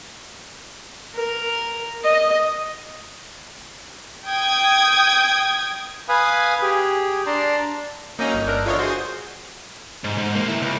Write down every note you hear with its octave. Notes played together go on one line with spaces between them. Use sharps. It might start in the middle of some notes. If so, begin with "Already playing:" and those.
A#4
D#5
G5 D#6 G#6
B4 F5 G#5 B5 D#6
G4 G#4
D4 D5 A5 A#5 C6
F#3 A#3 C#4 D#4
G1
D4 A4 A#4
E2 D3 F4 C#5 D#5
F#4 G#4 C5
G#2
G#2
D#2 A#3
E4 A#4
C#2